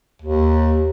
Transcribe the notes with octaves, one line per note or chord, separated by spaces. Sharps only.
D#2